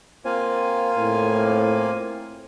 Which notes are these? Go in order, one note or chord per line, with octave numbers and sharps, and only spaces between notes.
A#3 C4 F4 G#5
A2 C4